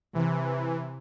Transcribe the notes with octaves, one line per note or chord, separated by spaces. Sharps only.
C3 E3